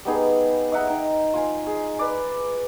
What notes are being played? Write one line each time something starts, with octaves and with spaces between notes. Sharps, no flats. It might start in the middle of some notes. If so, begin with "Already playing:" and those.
G3 B3 D#4 G#4
D#5 E5 F#5 A#5
D#4 G5
F4 G#5 C6
G#4
B4 D5